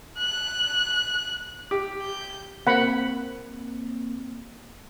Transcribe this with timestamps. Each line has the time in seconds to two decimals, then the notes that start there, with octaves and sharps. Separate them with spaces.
0.19 F#6
1.71 G4
2.02 G6
2.67 A#3 C4 F#5 B5